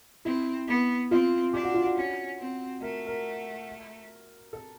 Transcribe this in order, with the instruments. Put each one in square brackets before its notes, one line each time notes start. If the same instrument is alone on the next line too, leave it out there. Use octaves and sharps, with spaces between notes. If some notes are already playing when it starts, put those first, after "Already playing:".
[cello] C4 [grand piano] E4
[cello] B3
[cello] C4 [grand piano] F4
[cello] D4 [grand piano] G4
[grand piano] F#4
F4
F#4
[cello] C#4
C4
[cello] A3 [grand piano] A#4
[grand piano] A#4
A4